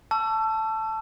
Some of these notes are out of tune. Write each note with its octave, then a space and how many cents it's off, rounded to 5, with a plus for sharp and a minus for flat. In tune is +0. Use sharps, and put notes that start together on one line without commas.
A5 +0 C#6 +30 E6 +30